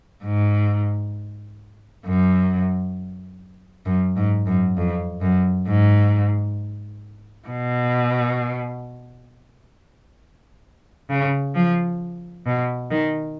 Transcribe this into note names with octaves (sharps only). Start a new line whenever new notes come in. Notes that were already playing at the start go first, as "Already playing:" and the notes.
G#2
F#2
F#2
G#2
F#2
F2
F#2
G#2
B2
C#3
F3
B2
D#3